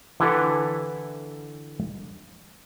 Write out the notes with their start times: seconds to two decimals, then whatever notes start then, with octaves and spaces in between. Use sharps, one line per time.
0.20 D3 E3 E4 G4 A4 B4